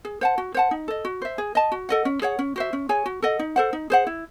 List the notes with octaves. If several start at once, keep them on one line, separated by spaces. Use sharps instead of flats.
G#4
C5 F#5 A5
F#4
C5 F#5 A5
D#4
A4 D#5
F#4
C5 E5
G#4
D#5 A5
F#4
A4 D#5 F#5
C#4
G#4 C#5 F#5
C#4
F#4 C5 E5
C#4
G#4 C#5 G#5
F#4
A4 D#5 F#5
D#4
A4 C5 F#5
D#4
G#4 C5 F#5
E4